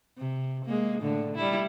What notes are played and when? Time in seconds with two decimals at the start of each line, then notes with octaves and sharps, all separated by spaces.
0.18 C3
0.65 G#3 A#3
1.01 A2 D3
1.36 G3 E4